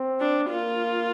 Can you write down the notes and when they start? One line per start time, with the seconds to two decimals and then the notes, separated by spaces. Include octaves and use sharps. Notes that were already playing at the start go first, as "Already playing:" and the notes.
Already playing: C4
0.20 D4
0.49 A#3 F4